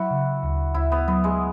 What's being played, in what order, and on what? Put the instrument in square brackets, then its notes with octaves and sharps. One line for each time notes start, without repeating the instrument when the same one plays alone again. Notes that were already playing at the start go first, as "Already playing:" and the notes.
Already playing: [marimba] F#3 [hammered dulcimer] E4 F#4
[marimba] C#3
D2
[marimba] D2 [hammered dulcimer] E4
[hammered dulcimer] B3
[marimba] F#3 [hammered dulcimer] B3
[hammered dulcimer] G#3